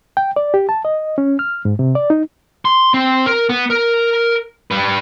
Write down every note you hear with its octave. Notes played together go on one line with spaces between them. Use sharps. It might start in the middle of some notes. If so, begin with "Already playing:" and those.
G5
D5
G4
A5
D#5
C#4
F6
G#2
C3
D5
D#4
C6
C4
A#4
B3
A#4
G3 B4